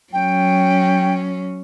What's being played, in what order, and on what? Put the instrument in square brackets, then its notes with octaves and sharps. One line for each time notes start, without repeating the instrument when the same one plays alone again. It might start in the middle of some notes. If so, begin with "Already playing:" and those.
[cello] F#3 C#4 [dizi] G5